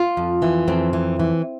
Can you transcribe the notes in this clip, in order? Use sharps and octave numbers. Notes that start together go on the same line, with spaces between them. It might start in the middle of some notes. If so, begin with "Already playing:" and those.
Already playing: F4
F2
E3
F2 C4
E3
E3